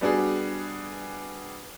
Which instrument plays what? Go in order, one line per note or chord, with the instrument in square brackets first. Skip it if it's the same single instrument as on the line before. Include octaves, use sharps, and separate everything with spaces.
[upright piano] G3 B3 D4 F#4 G#4